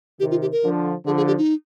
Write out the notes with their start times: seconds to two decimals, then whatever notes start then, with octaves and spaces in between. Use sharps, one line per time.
0.20 C3 D#3 G4
0.31 F4
0.41 G4
0.52 A#4
0.63 D3 F3
1.05 D3 F3 G#4
1.17 G#4
1.27 G4
1.38 D#4